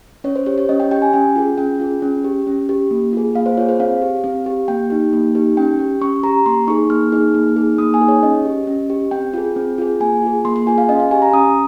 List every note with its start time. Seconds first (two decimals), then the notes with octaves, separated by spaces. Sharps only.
0.24 C#4 C#5
0.36 C5
0.46 G4 C#5
0.58 C#5
0.69 C#4 D#5
0.80 G5
0.91 G4 G5
1.02 G#5
1.13 C#4 G5
1.36 F4 G#4
1.58 C#4 G5
1.80 F4 G#4
2.02 C#4
2.24 G4
2.47 C#4
2.69 G4
2.91 A#3
3.13 F4 G#4
3.35 A#3 F5
3.46 C5
3.57 F4 G#4 C#5
3.69 C5
3.80 C4 F5
4.02 G4
4.24 C4
4.46 G4
4.68 A#3 G5
4.90 D#4 G4
5.13 A#3
5.35 D#4 G4
5.57 C#4 G5
5.79 G4
6.01 C#4 C#6
6.23 G4 A#5
6.46 A#3 C6
6.67 D#4 G#4 C#6
6.90 A#3 F6
7.12 D#4 G#4
7.34 A#3
7.56 D#4 G#4
7.78 A#3 D#6
7.94 G#5
8.01 D#4 G#4
8.09 C#5
8.23 C#4 D#5
8.45 G4
8.67 C#4
8.90 G4
9.11 C4 G5
9.34 F4 G#4
9.56 C4
9.78 F4 G#4
10.00 A#3 G#5
10.22 F4 G#4
10.45 A#3 C6
10.56 C6
10.67 F4 G#4 G#5
10.78 F5
10.89 C#4 D#5
11.00 F5
11.11 G4 G#5
11.22 A#5
11.33 C#4 D#6